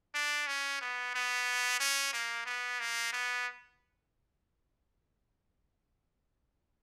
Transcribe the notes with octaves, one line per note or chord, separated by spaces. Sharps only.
D4
C#4
B3
B3
C#4
A#3
B3
A#3
B3